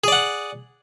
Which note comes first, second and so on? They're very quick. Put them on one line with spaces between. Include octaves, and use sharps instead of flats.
G#4 D5 F#5